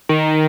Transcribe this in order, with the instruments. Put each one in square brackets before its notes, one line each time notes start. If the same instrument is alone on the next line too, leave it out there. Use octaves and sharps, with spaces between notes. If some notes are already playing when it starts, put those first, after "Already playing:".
[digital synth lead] D#3